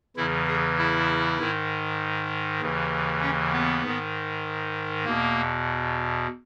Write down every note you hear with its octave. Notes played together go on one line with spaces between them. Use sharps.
E2 C#3 E3 E4
G#4
E4
G#2 D#3
D#2 C#3 E3
C#4
B3
G#2 D#3
E2 B2 A#3